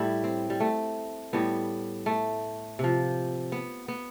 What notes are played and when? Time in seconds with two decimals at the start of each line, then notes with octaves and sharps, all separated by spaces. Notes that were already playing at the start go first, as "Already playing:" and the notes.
Already playing: A2 G3 E4
0.24 C4
0.50 G3
0.60 A3
1.33 A2 G3 B3
2.06 A3
2.79 C3 F3
3.52 B3
3.88 B3